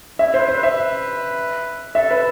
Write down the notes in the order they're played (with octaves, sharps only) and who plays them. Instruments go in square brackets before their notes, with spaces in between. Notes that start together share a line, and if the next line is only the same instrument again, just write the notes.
[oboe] E4 [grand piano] E5
[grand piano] C5
[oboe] B4
[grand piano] C5
[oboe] B4 [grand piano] E5
[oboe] A4 [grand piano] E5
[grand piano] B4